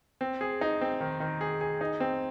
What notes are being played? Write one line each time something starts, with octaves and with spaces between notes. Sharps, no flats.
C4
G#4
D#4
C4
D#3
D#3
G#4
G#4
D#4
C4